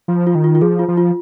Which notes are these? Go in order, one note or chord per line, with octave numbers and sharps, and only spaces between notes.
F3 F4
F4
D#3
F4
F4
F3 G#4
F4
F3
F4